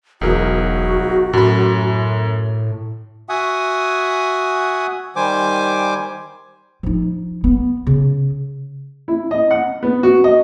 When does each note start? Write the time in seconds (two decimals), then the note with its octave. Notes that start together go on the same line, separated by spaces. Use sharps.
0.21 E1 B1 F#4 G#4 A#4
1.33 F#2 A2 B5
3.29 F#4 E5 F#5 G#5 D#6
5.16 D#3 G3 C5 G#5 D6
6.83 F3 D#4
7.44 B3
7.87 C#3
9.08 E4
9.31 D#5
9.51 F#5
9.83 B3
10.03 F#4
10.24 D#5